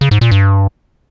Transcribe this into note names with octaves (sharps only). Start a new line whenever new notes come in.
C#3
G#2
A#2
G2